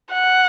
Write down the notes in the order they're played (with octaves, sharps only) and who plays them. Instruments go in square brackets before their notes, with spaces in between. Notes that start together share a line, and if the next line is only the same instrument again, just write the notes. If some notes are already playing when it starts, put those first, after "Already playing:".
[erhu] F#5